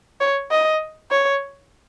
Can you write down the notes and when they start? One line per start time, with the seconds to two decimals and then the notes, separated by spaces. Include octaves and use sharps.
0.20 C#5
0.51 D#5
1.11 C#5